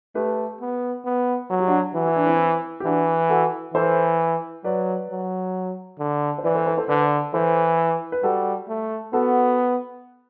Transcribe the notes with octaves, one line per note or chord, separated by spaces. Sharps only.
A3 G4 B4
B3
B3
F#3 F#4
G4
D4 F#4
E3 F#4
E4
D4
C4 E4
G4
E3 D4 F#4
F#4 A4
E3 A4 C5
F#3 B4 D5
F#3
D3
C5
E3 B4 D5
A4 C5
A4 C5
A4 C5
D3 B4 D5
E3 A4 C5
B4
G3 F#4 A4
A3
B3 F#4 A4